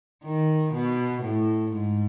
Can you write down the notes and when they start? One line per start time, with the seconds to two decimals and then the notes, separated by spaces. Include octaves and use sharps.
0.24 D#3
0.73 B2
1.22 A2
1.71 G#2